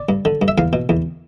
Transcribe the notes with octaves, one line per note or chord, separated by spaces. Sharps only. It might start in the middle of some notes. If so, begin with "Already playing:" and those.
Already playing: D5
G2
D3
G2
E5
E2 F5
B2
E2